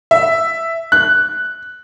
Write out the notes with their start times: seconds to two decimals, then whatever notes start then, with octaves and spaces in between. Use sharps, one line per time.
0.11 E5
0.92 F#6